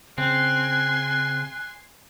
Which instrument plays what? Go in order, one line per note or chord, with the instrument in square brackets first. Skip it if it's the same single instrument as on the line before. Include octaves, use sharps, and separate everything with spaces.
[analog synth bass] C#3 [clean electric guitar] C4 [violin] G#5 C6 [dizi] F#6